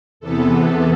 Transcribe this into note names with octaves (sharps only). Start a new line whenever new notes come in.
E2 C3 E3 B3 A4